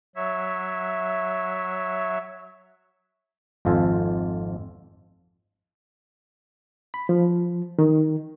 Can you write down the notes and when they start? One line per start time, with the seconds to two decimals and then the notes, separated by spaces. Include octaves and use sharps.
0.16 F#3 C#5 E5
3.65 G#1 F2 F4 A4 C5 G#5
6.94 B5
7.09 F3
7.79 D#3